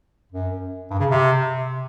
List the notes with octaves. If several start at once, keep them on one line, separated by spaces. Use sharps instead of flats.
F#2
G2
C#3
C3